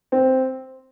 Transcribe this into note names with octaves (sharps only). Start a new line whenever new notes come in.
C4